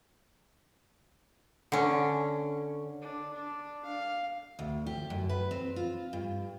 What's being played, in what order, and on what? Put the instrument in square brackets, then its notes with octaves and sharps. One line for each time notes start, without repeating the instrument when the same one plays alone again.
[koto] D3 C#4
[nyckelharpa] D4
D4
F5
[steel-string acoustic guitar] D2
G4
F#2
B4
C4
F4
G2